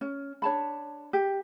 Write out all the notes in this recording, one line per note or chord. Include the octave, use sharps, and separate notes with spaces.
C#4
D4 C#5 A5 B5
G4